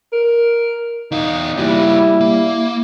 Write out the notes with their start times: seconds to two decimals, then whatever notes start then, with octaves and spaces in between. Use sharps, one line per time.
0.13 A#4
1.12 E2 D#4 F5
1.57 G3 A#3 E4 F#4
2.21 A#3